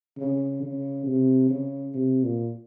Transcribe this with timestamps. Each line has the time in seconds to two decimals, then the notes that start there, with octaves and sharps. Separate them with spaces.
0.18 C#3
0.62 C#3
1.06 C3
1.49 C#3
1.94 C3
2.24 A#2